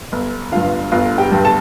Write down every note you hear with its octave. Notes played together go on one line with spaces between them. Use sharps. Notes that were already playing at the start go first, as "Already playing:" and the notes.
G1
G2 D3 F4 F5
G1 F4 F5
G4 G5
G2 D3
A4 A5